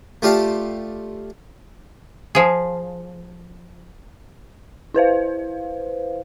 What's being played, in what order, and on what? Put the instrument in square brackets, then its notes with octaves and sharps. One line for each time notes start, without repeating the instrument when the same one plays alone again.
[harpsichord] A3 F4 G4 D5 F5 A5
[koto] F3 G#4
[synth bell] E4 B4 C5 F5